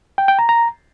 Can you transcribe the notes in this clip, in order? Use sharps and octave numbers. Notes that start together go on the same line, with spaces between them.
G5
G5
A#5
A#5